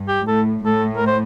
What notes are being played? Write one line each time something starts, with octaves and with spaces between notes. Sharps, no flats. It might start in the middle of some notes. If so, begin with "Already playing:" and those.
Already playing: G2
G4
A2 A4
A2 A4
A#4
C5